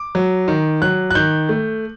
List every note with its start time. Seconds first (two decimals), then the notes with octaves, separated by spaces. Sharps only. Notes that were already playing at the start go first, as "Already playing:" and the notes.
Already playing: D6
0.15 F#3
0.48 D#3
0.82 F#3 F#6
1.11 F#6
1.15 D#3 G6
1.49 A3